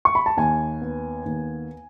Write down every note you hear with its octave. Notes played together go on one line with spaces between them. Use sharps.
C#6
B5
A5
D#2 G#5
B3
D#2